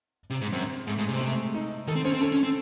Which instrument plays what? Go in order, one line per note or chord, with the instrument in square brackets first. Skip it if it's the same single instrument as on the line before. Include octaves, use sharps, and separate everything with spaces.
[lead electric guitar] C3
G#2
[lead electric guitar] F#2 [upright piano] C4
[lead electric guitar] G#2 [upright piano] A3
[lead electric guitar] G#2
[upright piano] G#3
[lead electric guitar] C3 [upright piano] C4
[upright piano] A3
D#4
[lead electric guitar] D#3 [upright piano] A4
[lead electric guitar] C4
[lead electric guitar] C#4 [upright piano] C5
[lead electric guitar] C4
[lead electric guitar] C#4 [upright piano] A4
[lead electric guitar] C#4
C4